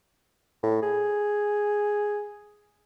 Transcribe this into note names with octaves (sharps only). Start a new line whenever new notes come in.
A2
G#4